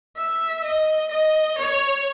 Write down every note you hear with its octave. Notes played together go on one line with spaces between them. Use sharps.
E5
D#5
D#5
C#5